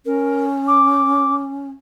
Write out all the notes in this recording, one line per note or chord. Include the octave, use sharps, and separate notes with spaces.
C#4 A#4
D6